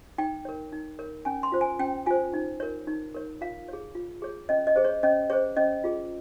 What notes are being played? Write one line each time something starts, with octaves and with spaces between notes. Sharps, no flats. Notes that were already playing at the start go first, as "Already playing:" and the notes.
D#4 G5
A#4 C#5
D#4
A#4 C#5
C#4 G#5
C6
F4 C5
G#5
C#4 G5
F4 C5 G#5
D#4
A#4 C#5
D#4
A#4 C#5
F4 F5
G#4 C#5
F4
G#4 C#5
C#4 D#5
D#5
G#4 C5
C#5
C#4 D#5
G#4 C5 C#5
C#4 D#5
F4 G#4